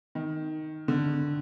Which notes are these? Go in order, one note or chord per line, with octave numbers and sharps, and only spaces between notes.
D#3
D3